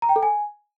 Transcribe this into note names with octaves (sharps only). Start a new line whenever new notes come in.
A#5
G5
A4
G#5